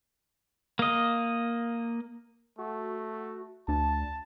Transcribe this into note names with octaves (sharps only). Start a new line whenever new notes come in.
A#3 D#5
A3 F#4
D2 D4 A5